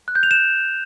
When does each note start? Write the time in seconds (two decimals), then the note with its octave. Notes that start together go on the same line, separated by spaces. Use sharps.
0.08 F#6
0.15 G6
0.23 F7
0.31 E7